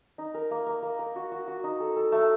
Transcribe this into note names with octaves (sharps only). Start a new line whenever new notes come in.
D#4
A#4
A#3
A#3
A#3
A#4
F#4
F#4
F#4
D#4
A4
A4
A3